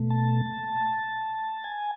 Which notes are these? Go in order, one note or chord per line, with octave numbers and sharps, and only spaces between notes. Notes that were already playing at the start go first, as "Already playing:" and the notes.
Already playing: B2 A3
A5
G#5